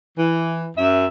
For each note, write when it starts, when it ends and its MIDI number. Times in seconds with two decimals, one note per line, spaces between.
0.18 0.70 52
0.78 1.06 42
0.78 1.06 76